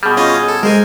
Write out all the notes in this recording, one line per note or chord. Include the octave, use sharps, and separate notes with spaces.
B2 G3 G#4
C#4 F4 D#5
A4
G#3 A#4 C5 G#5